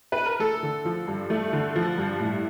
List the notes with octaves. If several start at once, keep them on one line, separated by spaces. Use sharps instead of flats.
B4
A#4
A3 A4
D3
F3
G2
A3
D3
F3
G2
A2